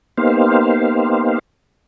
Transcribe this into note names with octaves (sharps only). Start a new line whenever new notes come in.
A#3 B3 D#4 G4 C5 F5